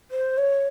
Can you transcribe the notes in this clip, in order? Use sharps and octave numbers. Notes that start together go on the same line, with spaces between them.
C5
C#5